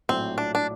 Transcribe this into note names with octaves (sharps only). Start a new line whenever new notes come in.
A#1 A2 F#3 C4
D4
D4